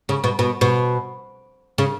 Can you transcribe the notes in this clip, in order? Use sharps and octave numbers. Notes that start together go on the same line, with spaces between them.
C#3
B2
B2
B2
C#3